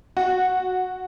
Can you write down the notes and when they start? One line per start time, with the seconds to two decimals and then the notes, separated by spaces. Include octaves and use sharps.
0.17 F#4